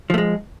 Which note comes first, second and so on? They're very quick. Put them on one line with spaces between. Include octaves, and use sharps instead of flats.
F3 A3 G#3